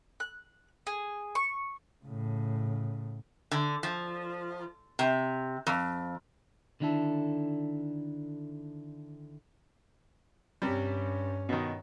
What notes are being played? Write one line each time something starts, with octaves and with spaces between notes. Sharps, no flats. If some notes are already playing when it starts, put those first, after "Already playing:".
F#6
G#4
C#6
A2 C#3
D3
F3
C3
F2
D3 D#3 D4 E4 A4
G2 C3 G3 C#4
B2 D#3